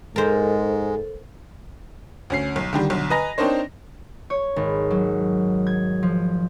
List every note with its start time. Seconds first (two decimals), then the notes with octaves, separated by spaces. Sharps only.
0.16 G#2 G#3 A4 A#4 C5
2.30 D2 C#4 C7
2.56 B1
2.73 D3 D#3 G3
2.90 B1 D3
3.10 B4 D#5 G#5 A#5 A#6
3.38 C4 D4 D#4 A#4 C5 C#5
4.30 C#5
4.56 G#1
4.91 F#3
5.67 G#6
6.03 F3